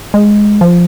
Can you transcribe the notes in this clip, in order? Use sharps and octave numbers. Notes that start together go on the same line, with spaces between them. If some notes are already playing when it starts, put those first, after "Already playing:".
G#3
F3